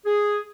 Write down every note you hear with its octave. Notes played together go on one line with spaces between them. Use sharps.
G#4